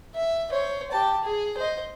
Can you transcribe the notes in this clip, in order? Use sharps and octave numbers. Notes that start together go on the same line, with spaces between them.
E5
C5 C#5
G4 A5
G#4
C5 D#5